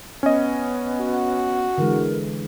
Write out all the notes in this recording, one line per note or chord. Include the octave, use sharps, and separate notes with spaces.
B3 C#4 D#5
F#4
D3 E3 G#3 A#4